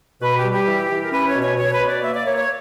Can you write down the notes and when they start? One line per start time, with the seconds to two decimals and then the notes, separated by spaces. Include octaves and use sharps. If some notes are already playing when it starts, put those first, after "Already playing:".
0.21 B2 B4
0.37 G4
0.44 G3
0.51 G4
0.66 E3
0.90 E3
1.03 A#4
1.12 C#4 B4
1.27 C#5
1.35 B2
1.42 C#5
1.57 B2 C#5
1.72 B4
1.80 B2
1.87 D5
2.02 A#3 E5
2.14 D5
2.25 A#3 C#5
2.36 C#5